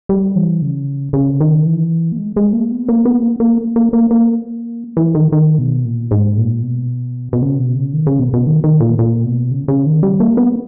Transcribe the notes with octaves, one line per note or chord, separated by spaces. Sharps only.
G3
E3
C#3
C#3
D#3
E3
A#3
G#3
G#3
A#3
B3
A#3
B3
A#3
A#3
A#3
A#3
A#3
E3
D#3
D#3
B2
A#2
G#2
A#2
B2
B2
C#3
B2
C#3
D#3
C#3
B2
B2
D#3
D#3
A#2
A#2
B2
C#3
C#3
D#3
G3
A#3
B3